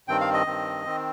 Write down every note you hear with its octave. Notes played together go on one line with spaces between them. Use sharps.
G2 D#3 C4 G5
F5
D#5
G2 D#3 C4
D#3 C4